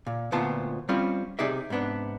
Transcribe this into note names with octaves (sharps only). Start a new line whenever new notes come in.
A#2
D2 A#2 B3 C4 F4 A5
G3 C4 C#4 F4
C3 D#4 G#4 D5 E5
G#2 C3 B3 D4